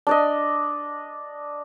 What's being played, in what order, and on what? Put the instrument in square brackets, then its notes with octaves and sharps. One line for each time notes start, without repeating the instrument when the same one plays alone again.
[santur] D4 D5 D#5